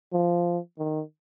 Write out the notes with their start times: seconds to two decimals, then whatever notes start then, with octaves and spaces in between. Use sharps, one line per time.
0.13 F3
0.79 D#3